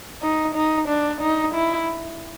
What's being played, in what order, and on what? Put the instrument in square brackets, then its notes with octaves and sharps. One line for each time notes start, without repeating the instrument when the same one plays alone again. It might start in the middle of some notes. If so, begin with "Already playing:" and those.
[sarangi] D#4
D#4
D4
D#4
E4